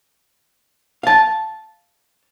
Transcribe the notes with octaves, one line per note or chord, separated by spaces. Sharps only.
F5 A5